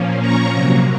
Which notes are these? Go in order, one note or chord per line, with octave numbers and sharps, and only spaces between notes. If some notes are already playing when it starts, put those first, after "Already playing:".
Already playing: A#2 F3 A#3 C#4
A#5 C#6
C3 F#3 A#3 A#5 C#6